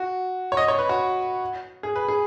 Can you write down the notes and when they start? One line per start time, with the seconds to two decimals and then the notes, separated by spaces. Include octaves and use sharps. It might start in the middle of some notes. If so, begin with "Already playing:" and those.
Already playing: F#4
0.52 C#5
0.57 D#5
0.68 C#5
0.79 B4
0.89 F#4
1.83 G#4
1.96 B4
2.08 G#4